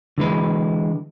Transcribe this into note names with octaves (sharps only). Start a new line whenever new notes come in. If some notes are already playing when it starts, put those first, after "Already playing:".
D3 E3 G#3 B4